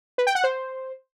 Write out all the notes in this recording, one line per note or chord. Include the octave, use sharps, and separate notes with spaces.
B4
G5
F#5
C5